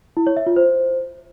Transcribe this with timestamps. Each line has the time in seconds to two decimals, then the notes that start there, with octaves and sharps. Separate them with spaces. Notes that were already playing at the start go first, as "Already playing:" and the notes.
0.17 E4
0.27 C#5
0.37 E5
0.46 F4
0.56 C5